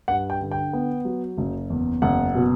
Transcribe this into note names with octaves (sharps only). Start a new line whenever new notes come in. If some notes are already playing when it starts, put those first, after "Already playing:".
G2 F#5
G5
D3
G5
B3
F#3
F#1
E2
F#1 F#5
B2